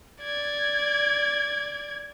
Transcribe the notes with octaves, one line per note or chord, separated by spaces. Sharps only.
D5 G#6